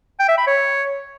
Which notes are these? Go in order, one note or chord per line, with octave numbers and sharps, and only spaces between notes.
G5
E5
B5
C#5